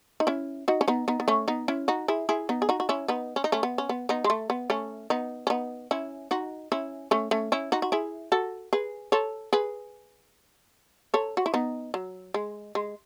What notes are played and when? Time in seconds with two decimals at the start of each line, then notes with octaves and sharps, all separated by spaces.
0.20 D#4
0.27 C#4 E4
0.68 D#4 F#4
0.81 C#4
0.88 B3 D#4
1.08 B3 D#4
1.20 B3
1.28 A3 C#4
1.48 B3 D#4
1.68 C#4 E4
1.88 D#4 F#4
2.08 E4 G#4
2.29 E4 G#4
2.49 B3 D#4
2.62 G#4
2.69 D#4 F#4
2.80 F#4
2.89 C#4 E4
3.08 B3 D#4
3.36 C#4
3.44 D#4
3.52 A3 C#4
3.63 B3
3.78 C#4
3.89 B3
4.09 B3 D#4
4.24 G#3
4.30 A3
4.50 B3
4.70 A3 C#4
5.10 B3 D#4
5.47 C#4
5.50 B3 D#4
5.91 C#4 E4
6.31 D#4 F#4
6.72 C#4 E4
7.11 A3 C#4
7.31 A3 C#4
7.52 C#4 E4
7.72 D#4 F#4
7.82 F#4
7.92 E4 G#4
8.32 F#4 A4
8.73 G#4 B4
9.12 A4 C#5
9.53 G#4 B4
11.14 A4 C#5
11.37 F#4
11.46 E4
11.54 B3 D#4
11.94 F#3
12.34 G#3
12.75 G#3